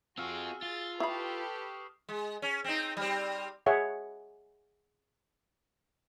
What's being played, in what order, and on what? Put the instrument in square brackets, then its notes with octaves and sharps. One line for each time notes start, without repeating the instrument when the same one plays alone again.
[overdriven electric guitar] C4 F4 [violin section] F#4 G#4 [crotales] E6 F6
[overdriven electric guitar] F4 [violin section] G#4 A6
[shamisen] E4 B5 [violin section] G4 A4 B4 [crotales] C#6 D#6 C7
[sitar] G#3
C#4
C4 D#4
G3 C4
[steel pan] G#4 C#5 E5 F#5